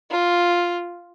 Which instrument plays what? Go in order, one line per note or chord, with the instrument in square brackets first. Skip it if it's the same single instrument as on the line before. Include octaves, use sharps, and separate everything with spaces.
[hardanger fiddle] F4